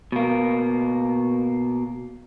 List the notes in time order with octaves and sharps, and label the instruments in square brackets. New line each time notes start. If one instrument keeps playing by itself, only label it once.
[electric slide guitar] B2 A#3